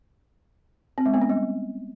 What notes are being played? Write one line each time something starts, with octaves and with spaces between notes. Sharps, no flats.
C4
G#3
B3
C#4
G3